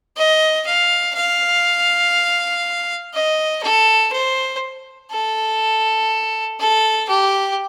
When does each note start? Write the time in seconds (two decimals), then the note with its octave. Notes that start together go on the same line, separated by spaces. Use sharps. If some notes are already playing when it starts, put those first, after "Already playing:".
0.16 D#5
0.66 F5
1.15 F5
3.14 D#5
3.63 A4
4.12 C5
5.11 A4
6.60 A4
7.09 G4